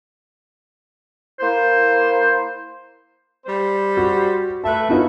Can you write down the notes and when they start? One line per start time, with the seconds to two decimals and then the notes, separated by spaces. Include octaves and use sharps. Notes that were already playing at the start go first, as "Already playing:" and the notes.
1.40 A#3 E4 C5
3.45 G3 C5
3.97 F#4
4.64 A3 B4 E5 A5
4.89 B3 C#4 D#4 F4 F#4 B4